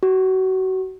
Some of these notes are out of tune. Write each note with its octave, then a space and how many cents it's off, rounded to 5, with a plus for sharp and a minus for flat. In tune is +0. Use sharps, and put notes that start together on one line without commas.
F#4 +30